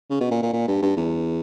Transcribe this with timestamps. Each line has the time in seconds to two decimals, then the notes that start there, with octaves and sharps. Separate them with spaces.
0.10 C#3
0.21 B2
0.31 A#2
0.42 A#2
0.53 A#2
0.68 G2
0.83 G2
0.97 E2